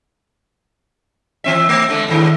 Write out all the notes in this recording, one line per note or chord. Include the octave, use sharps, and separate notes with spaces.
E3 C4 E5
A3
D3 G#3 A3
E2 A2 D#3